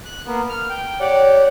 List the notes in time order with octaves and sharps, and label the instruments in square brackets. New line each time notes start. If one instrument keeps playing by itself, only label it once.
[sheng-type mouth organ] F#6
A#3 B3
F6
G5
[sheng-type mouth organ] G4 D5 F#5 [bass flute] C#5